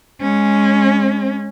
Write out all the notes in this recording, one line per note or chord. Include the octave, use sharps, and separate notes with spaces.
G#3 C#4